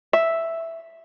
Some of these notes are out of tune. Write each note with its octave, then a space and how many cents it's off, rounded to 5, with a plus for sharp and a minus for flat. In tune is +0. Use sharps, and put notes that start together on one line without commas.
E5 +0